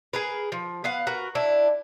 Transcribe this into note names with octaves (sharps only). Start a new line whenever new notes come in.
G#4 A#4 B4
F3
B3 F5 F#5
F#4 A#4 B4
D4 E4